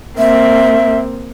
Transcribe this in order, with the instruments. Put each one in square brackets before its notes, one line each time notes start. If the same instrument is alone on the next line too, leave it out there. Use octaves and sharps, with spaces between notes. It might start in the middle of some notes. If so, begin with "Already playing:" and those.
[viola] A#3 C4 [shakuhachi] E5